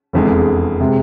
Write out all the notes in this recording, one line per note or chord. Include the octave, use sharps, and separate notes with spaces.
F1 E2 D3 G#3
C3 G#3